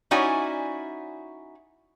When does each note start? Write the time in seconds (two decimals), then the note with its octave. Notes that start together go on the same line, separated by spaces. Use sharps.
0.11 C#4 D#4 E4 F#4 D5 G#5